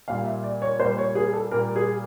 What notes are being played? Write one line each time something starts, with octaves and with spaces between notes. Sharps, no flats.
A#2 G3 A#3 F5
E5
D5
C#5
A#2 G3 A#3 C5
C#5
G#4
A4
A#2 G3 A#3 A#4
G#4